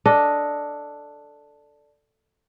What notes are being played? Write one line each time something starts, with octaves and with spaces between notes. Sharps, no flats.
D4 A4 D#5